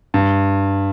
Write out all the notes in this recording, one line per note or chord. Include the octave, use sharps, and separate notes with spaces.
G2